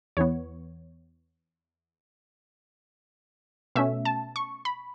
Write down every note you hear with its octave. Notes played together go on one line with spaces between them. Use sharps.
E2 E3 B3 C#5
B2 A3 C#4 E5
A5
C#6
B5